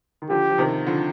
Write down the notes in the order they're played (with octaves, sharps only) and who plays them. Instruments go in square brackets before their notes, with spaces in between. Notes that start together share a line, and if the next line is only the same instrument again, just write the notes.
[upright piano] D#3
[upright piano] D3 F3 [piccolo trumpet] G4
[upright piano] F3
C3 D#3
D3 F3